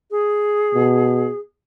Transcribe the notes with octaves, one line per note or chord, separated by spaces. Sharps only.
G#4
B2